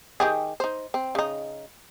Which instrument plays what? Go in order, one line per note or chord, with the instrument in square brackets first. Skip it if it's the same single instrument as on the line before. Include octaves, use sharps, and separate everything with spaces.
[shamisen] D#3 G4 G#4
D#4 C5
C4
C#3 D#4